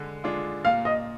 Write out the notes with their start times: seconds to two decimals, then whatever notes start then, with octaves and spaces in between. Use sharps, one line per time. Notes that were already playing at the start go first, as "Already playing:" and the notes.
Already playing: D3 G#3
0.24 G#3 D4 F4
0.65 A#2 F5
0.85 D#5